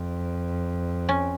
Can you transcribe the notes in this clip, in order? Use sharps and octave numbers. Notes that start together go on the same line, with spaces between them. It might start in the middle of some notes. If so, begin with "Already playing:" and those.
Already playing: F2
C#4